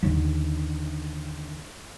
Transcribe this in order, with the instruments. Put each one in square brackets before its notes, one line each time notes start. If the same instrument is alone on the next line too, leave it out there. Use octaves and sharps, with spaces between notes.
[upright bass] D#2 D3